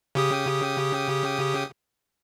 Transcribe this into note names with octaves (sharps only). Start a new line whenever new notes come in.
C#3 G4 D#6